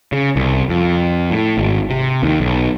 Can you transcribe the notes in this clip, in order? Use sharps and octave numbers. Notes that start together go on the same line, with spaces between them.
C#3
C2
F2
A2
G#1
C3
D#2
B1